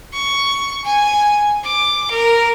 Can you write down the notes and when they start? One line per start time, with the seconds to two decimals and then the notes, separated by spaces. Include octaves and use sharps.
0.13 C#6
0.84 G#5
1.64 D6
2.10 A#4